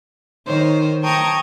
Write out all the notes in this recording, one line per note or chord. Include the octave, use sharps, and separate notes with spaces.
D#3 C5 C#5
G5 A5 A#5 C#6 D#6 G#6